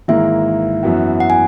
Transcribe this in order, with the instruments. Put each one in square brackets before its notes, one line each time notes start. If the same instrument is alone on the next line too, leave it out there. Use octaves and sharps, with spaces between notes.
[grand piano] G#1 G#2 E3 A#3 E4 [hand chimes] E5
[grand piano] F#2 E3 B3 F#4
[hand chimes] F#5
G#5